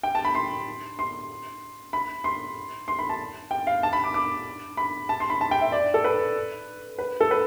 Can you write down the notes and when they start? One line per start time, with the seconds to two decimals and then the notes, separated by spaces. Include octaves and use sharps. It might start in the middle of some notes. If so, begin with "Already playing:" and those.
0.03 G5
0.15 A5
0.25 B5
0.35 C6
0.99 C6
1.93 B5
2.24 C6
2.88 C6
2.99 B5
3.09 A5
3.51 G5
3.67 F5
3.83 A5
3.93 B5
4.04 D6
4.14 D6
4.77 B5
5.09 A5
5.20 C6
5.30 B5
5.41 A5
5.51 G5
5.61 E5
5.72 D5
5.94 A4
6.04 B4
6.99 B4
7.21 A4
7.31 B4